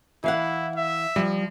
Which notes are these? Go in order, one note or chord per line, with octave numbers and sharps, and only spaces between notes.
E3 E4 F5 F#5
E5
F3 G3